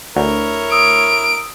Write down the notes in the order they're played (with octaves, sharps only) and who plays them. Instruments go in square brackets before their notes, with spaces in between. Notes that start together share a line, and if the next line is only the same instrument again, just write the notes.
[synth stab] D2 [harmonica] E4 A#4 C#5
[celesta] D#6 E6 [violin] D7